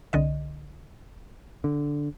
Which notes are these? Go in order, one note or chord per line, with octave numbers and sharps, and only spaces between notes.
C2 D3 D#5
D3